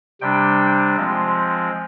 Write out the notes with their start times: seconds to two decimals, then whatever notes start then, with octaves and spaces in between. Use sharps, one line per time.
0.21 C3 G3 D4 G5
0.97 F3 G#3 C4